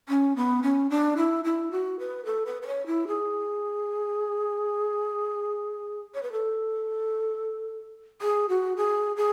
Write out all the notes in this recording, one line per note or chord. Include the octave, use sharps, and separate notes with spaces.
C#4
B3
C#4
D4
E4
E4
F#4
B4
A4
B4
B4
C#5
E4
G#4
C#5
B4
A4
G#4
F#4
G#4
G#4